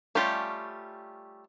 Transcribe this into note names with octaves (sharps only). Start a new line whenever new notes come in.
G3 A3 C#4 F4 G4